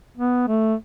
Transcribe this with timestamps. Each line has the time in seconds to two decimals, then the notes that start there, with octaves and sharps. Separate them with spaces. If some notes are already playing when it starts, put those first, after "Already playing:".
0.17 B3
0.47 A3